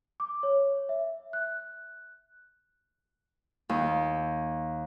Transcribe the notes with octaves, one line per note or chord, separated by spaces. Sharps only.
D6
C#5
E5
F#6
D#2